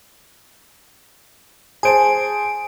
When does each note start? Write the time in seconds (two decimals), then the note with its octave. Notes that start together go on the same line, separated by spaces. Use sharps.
1.83 G#4 C5 G#5 A5 D7